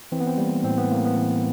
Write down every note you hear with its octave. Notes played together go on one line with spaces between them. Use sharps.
E3 C4
B3
C4
G3 A#3
A2 C4
B3
A2 A#3
B3
E3